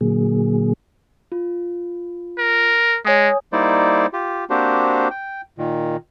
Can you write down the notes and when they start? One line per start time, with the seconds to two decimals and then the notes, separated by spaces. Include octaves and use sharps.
0.01 A#2 D3 F#3 A#3 G#4
1.32 F4
2.38 A#4
3.05 G#3 C#5 G#5 D#6
3.53 G3 A#3 D#4 E4 C5 D5
4.13 F4 G4
4.50 A#3 C4 D4 F#4 G4 C5
5.11 G5
5.58 A#2 D#3